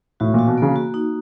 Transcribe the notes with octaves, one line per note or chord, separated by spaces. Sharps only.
A2 F#4
A#2 F#4
B2
C#3 A#3
F#4
D#4